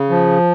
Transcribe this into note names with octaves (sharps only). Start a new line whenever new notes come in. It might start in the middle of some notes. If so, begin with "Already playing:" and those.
Already playing: C#3
F3